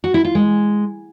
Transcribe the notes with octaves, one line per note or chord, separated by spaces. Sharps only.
F#4
E4
F4
G#3